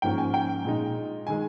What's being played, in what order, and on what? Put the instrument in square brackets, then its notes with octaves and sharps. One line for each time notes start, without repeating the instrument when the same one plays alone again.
[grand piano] G#2 F3 A#3 C#4 G5
G#5
G5
A#2 G#3 D#4
D#3 G#3 G#5